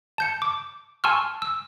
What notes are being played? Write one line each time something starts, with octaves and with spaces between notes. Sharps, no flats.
A5 G6 C#7
D6
G#5 A5 C6 C#6 E6 F6
E6